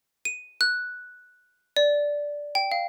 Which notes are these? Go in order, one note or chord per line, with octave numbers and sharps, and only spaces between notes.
D#7
F#6
D5
G5
F5